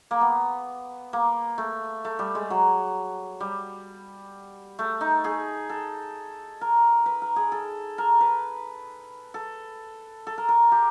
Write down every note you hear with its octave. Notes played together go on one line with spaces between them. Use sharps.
A#3
B3
A#3
A3
A3
G3
G#3
F#3
G3
A3
D#4
G#4
A4
A#4
B4
A#4
G#4
A4
A#4
B4
A4
A4
A#4
A#4
G4